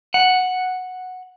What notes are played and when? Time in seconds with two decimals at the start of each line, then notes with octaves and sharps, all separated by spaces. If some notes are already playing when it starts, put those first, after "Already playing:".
0.14 F#5